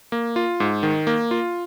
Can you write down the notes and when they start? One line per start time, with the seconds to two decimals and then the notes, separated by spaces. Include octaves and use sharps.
0.12 A#3
0.36 F4
0.60 G#2
0.83 D#3
1.07 A#3
1.31 F4